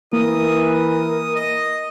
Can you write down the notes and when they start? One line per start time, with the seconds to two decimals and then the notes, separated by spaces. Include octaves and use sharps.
0.13 E3 A#3 A#4 D#6
0.74 D#6
1.36 D#5